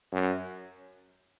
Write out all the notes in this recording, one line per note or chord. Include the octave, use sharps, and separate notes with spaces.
F#2